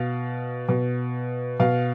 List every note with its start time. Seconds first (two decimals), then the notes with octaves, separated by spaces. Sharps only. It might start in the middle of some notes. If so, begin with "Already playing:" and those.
Already playing: B2 F5
0.69 B2
1.60 B2 F5